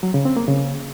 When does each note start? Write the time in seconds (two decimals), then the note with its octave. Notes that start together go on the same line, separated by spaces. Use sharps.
0.03 F#3
0.14 C#3
0.25 C4
0.37 A#3
0.48 C#3